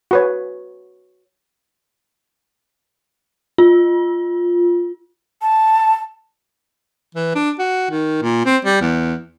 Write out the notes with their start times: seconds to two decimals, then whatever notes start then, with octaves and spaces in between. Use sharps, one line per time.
0.11 F#4 B4 C#5
3.58 F4
5.42 A5
7.15 E3
7.35 D4
7.59 F#4
7.91 D#3
8.22 A#2
8.45 C4
8.65 G3
8.81 E2